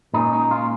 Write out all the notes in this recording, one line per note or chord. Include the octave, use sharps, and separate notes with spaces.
A#2 G#3 C#4 D#4
D#4
F4